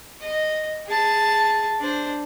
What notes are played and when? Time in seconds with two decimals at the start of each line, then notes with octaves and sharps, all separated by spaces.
0.21 D#5
0.86 G#4 A5
1.80 D4 C5